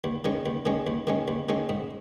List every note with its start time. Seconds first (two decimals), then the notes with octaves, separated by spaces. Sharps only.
0.04 D#2
0.24 D#3 G#3 C#4
0.46 D#2
0.66 D#3 G#3 C#4
0.87 D#2
1.07 D#3 G#3 C#4
1.28 D#2
1.49 D#3 G#3 C#4
1.69 G#2